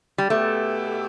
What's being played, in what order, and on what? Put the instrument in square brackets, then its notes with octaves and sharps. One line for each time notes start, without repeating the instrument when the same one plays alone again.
[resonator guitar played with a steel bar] G3
[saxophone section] B2 B3 E4 G4 [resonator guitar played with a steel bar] A3